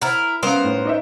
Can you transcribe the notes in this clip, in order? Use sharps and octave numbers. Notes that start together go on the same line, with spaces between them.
E4 A#4 C5 F#5
G3 B3 C#4 A#4 C5 F5
A2
D#4 D#5 E5